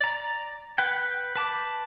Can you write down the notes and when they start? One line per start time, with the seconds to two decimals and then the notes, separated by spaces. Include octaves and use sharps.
0.01 D5 A#5
0.78 B4 F#5 G5
1.36 B4 A5 D6